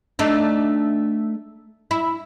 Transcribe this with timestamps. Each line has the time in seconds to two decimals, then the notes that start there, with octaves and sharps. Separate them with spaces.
0.19 A3 D4 D#4
1.91 E4